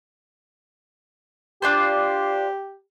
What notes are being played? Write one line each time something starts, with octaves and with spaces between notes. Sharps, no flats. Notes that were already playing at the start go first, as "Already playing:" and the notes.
D4 F4 G4 C5